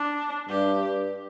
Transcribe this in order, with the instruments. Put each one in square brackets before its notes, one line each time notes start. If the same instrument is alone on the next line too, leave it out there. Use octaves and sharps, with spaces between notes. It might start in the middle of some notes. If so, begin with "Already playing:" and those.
Already playing: [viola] D4
[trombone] G2 [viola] G4